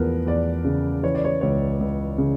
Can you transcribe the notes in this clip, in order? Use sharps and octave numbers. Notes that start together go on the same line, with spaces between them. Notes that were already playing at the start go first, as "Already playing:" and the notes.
Already playing: E2 F3 A#4 B4
E2 D5
C#3
E3 C#5
D5
C#5
C#2 C#5
C#2
C#3